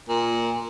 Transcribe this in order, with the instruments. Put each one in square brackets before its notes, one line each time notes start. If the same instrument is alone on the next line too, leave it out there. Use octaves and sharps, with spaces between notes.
[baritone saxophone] A#2